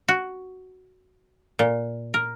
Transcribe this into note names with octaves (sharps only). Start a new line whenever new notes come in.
F#4
A#2
A#4